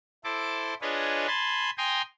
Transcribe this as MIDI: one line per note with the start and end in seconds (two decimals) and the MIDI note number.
0.24 0.74 64
0.24 0.74 69
0.24 0.74 72
0.24 0.74 86
0.82 1.27 62
0.82 1.27 65
0.82 1.27 68
0.82 1.27 71
0.82 1.27 73
0.82 1.27 75
1.28 1.70 80
1.28 1.70 81
1.28 1.70 83
1.28 1.70 84
1.78 2.02 79
1.78 2.02 80
1.78 2.02 82
1.78 2.02 84
1.78 2.02 87